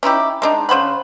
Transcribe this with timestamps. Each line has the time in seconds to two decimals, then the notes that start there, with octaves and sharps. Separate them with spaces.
0.03 C#4 D#4 E4 G4
0.42 G#3 D4 D#4
0.69 C#3 C5 F#5 B5